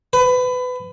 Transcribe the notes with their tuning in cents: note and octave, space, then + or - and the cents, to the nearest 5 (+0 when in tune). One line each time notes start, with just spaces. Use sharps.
B4 +25